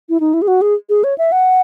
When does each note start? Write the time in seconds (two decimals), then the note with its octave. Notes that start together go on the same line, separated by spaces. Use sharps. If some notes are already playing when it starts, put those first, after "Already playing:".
0.09 E4
0.20 D#4
0.34 E4
0.42 G#4
0.48 F#4
0.61 G#4
0.89 G#4
1.04 C#5
1.18 E5
1.32 F#5